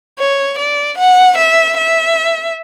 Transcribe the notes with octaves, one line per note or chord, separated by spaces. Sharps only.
C#5
D5
F#5
E5
E5